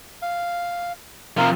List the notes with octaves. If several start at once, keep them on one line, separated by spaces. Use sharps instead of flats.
F5
C3 F3 A#4 F5